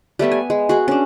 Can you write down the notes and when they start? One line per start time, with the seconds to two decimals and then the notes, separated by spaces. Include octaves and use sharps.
0.19 G3 A3 B3 E5
0.32 G#5
0.50 G#3
0.69 F#4 G#4
0.88 C#4 D4